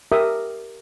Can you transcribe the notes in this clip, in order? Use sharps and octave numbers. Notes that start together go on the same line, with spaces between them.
G4 A#4 E5 D#6